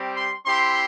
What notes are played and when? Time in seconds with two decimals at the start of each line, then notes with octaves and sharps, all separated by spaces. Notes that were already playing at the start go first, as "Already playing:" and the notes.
Already playing: G3 C4 G4
0.16 C6
0.45 C4 E4 G4 C6